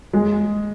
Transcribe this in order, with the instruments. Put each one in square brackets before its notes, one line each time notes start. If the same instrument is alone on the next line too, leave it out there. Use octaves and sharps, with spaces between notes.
[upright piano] G#3